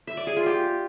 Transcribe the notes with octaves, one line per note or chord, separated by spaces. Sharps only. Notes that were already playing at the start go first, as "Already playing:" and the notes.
E5
D5
G#4
F4
G4